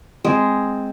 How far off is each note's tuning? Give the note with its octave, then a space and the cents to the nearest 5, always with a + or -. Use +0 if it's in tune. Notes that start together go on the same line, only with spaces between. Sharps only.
G#3 +0 C4 +0